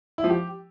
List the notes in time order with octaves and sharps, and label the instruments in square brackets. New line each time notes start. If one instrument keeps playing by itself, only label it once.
[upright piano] E4
F3
G4